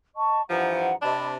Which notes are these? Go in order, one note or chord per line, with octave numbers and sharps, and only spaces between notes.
D#5 A5 C#6
G2 E3 F3 F#5 A#5
C3 D4 D#5 A5 B5